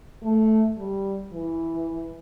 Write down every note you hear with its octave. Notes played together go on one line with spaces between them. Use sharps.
A3
G3
E3